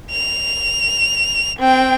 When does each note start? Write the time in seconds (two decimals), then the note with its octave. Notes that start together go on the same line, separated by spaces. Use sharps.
0.12 F7
1.59 C4 G5